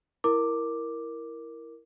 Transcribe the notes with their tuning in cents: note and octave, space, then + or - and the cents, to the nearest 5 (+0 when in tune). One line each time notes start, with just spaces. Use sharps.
E4 +0 A#4 +0 D6 +0